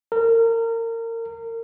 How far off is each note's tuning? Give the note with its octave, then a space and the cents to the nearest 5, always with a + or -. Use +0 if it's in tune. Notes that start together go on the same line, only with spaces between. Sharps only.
A#4 -30